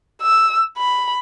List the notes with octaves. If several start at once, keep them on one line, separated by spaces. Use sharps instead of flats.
E6
B5